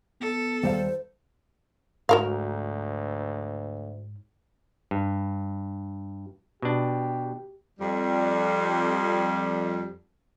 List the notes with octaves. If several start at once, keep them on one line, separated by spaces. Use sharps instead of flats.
B3 A4
D#2 G3 C5 F5
D2 G#2 F#4 A#4 F5
G2
B2 D4 G4
F2 G3